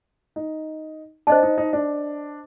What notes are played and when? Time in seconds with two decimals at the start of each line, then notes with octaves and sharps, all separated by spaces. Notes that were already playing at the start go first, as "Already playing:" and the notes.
0.36 D#4
1.27 D4 C5 D#5 A5
1.43 D#4
1.58 D#4
1.73 D4